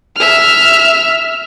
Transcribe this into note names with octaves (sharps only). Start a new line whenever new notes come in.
E5 F6